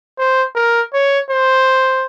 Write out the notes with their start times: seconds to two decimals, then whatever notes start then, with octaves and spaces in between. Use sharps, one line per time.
0.19 C5
0.55 A#4
0.94 C#5
1.31 C5